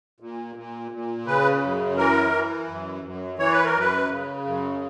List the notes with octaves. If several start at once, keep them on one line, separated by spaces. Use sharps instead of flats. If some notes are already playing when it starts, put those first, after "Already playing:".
A#2
A#2
A#2
C#3 B4
F#2
E3 A#4
E3
F#2
F#2
E3 C#5
B4
A#4
F#2 B4
C#3
F#2